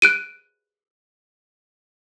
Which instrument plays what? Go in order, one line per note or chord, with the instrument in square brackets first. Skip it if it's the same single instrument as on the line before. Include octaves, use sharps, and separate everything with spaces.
[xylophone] F#6 D7 D#7